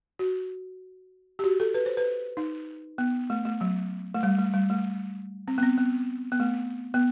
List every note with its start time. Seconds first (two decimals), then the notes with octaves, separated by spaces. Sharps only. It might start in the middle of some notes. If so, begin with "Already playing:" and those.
0.19 F#4
1.39 G4
1.44 F#4
1.60 A4
1.74 B4
1.86 C5
1.97 B4
2.37 D#4
2.98 B3
3.30 A3
3.45 A3
3.61 F#3
4.14 A3
4.23 G3
4.38 A3
4.54 G3
4.70 A3
5.48 C4
5.58 B3
5.63 C4
5.78 B3
6.32 B3
6.40 A3
6.94 B3